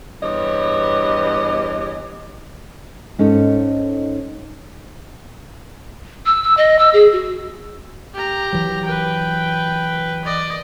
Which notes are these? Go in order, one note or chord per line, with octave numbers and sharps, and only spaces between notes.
E2 G2 G4 C#5 D#5
G#2 C#4 D#4 A4
E6
E6
D#5
E6
G#4
F#4
G4 A#5
E3 F#3
B4 G5
D5 D#5